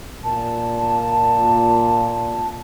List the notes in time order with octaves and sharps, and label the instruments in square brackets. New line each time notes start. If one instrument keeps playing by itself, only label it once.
[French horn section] A#2 [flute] A5